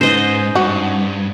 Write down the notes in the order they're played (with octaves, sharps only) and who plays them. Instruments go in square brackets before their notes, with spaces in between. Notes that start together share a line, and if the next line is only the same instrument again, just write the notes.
[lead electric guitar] G#2 [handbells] C#4 D#4 B4 [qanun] C5 D#5
[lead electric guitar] G2 [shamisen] F#4